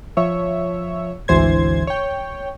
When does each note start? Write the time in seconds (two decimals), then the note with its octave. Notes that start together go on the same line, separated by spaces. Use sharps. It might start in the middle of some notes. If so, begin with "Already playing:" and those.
0.17 F3 C#5 E5
1.28 G#1 D2 E3 C5 G#6
1.87 C#5 G5